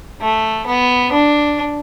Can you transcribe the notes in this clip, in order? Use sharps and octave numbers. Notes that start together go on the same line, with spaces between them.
A3
B3
D4